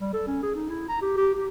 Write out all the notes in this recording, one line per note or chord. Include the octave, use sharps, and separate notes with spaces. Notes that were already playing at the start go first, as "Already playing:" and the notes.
G3
A4
C#4
G#4
D#4
E4
A#5
G4
G4
G4